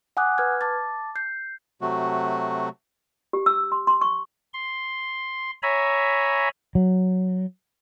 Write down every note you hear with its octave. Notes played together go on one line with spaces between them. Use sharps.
F#5 G#5 D6 D#6 F#6
B4 F6 G#6
A5 D6 A6
G6 C7
C3 F#3 A3 F#4
G4
E6
C6
C6
C#6
C6
C#5 E5 G#5 A#5 B5
F#3